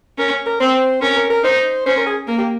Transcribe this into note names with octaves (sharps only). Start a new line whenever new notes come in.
C#4 A#4
A#4
C4 C5
C#4 A#4
A#4
A#4
D#4 C5
C#4 C5
A#4
G#4
A#3 A#4
G4